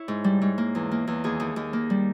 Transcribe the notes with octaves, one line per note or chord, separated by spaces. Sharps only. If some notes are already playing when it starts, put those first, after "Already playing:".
Already playing: E4 C#5
G#2
G3
G#2
A#3
E2
A#3
E2
D#2 G#4
D#2
D#2
A#3
G3